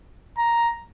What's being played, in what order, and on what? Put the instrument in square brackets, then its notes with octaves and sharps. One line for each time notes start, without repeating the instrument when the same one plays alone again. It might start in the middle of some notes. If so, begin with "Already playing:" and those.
[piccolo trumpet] A#5